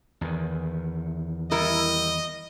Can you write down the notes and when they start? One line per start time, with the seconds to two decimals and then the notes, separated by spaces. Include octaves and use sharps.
0.21 E2 D#3
1.51 G3 E4 A#4 D#5